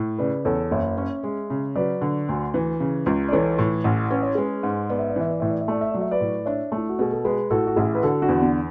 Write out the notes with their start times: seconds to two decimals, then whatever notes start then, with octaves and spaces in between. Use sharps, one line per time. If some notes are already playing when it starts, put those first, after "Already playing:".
Already playing: A2
0.18 C#3 B4 D5
0.45 E2 A4 C#5
0.71 F#1 C#5 E5
0.97 C#4
1.23 G#3
1.50 C#3
1.75 F#3 B4 D5
2.01 D3
2.29 D2
2.54 E3
2.80 C#3
3.06 C#2
3.28 D5
3.32 E3 A4 C#5
3.58 A2
3.84 A1
4.10 C#4 B4
4.23 C#5
4.35 G#3 G#4 B4
4.63 G#2
4.89 B3 D5
4.99 E5
5.10 D5
5.16 E3 E5
5.30 D5
5.40 A2 E5
5.50 D5
5.61 E5
5.68 A3 D5
5.81 E5
5.91 F#3 D5
6.01 E5
6.11 B4 D5
6.20 A2
6.45 D4 C#5 E5
6.72 A3
6.77 E4
6.89 F#4
6.99 B2 G#4
7.12 A4
7.25 G#3 G#4 B4
7.51 A2 F#4 A4
7.67 F#4
7.76 A1 E4 G#4
7.95 B4
8.02 D3 F#4 A4
8.22 D4 F#4
8.28 E2
8.42 B3 D4